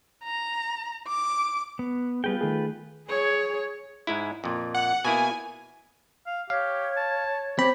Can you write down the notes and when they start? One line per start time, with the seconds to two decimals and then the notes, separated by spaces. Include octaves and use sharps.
0.24 A#5
1.08 D6
1.79 B3
2.24 G3 B3 F4 G#4 B4 G5
2.41 D#3 A3 G#4
3.07 G#4 C#5
4.07 G#2 G#3 E4
4.44 F2 A#2
4.74 F#5
5.05 B2 A#3 E4 G#5
6.27 F5
6.50 G4 C#5 F5
6.97 A5
7.59 C4 G4 B5